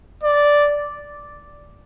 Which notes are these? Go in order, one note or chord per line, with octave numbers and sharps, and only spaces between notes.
D5